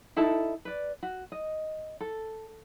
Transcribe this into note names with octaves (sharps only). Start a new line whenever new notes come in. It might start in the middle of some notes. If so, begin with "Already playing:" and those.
D#4 E4 A4 A5
B4 D5
F#4
D#5
A4